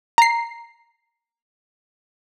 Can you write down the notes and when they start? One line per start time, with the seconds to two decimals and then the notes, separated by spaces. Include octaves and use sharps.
0.18 A#5 C7